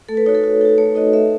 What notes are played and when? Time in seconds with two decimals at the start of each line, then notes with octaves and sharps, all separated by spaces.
0.09 A3 A4
0.17 B4
0.26 D#4 F#4 C#5
0.35 A4
0.43 A3 F#4
0.61 D#4 F#4 A4
0.78 A3 C#5
0.95 D#4 F#4 D#5
1.13 A3 E5